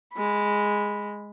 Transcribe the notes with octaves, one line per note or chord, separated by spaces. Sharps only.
G#3 B5